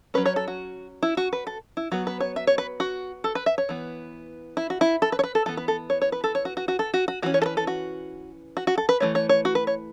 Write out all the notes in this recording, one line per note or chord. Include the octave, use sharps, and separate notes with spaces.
F#3 C#4 B4
C#5
A4
F#4
E4
F#4
B4
A4
E4
F#3 B3 F#4
B4
C#5
E5
C#5
B4
F#4
A4
B4
E5
C#5
E3 B3
E4
F#4
E4
A4
B4
C#5
B4
A4
E3 B3 A4
B4
A4
C#5
C#5
B4
A4
C#5
F#4
F#4
F#4
A4
F#4
F#4
E3 C#4 F#4
C#5
A4
B4
A4
F#4
F#4
F#4
A4
B4
E3 A3 C#5
C#5
C#5
F#4
B4
C#5